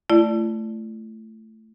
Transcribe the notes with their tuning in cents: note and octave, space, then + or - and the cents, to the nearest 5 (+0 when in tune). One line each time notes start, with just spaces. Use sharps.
A3 +0 E4 +45 D5 +0